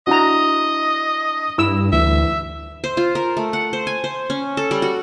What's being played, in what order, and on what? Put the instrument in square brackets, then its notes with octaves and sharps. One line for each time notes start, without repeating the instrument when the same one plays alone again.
[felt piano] D4 E4 [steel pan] F#4 A#5 [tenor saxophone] D#5
[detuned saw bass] G2 [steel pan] E4 E6
[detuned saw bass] D2 [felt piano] E3 [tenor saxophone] E5
[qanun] C5
F4
A#4
A3
F#5
C5
G#5
C5
C#4
A4
G3
F#4